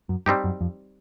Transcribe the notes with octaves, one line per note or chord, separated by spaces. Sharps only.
F#2
G2 G3 C4 D#4 G4
F#2
F2